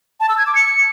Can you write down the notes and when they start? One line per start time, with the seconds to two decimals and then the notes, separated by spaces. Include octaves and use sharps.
0.20 A5
0.29 E6
0.38 G#6
0.46 D6
0.55 C#7